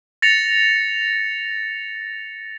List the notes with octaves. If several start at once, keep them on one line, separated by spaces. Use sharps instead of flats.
A6 A#6 C#7 F7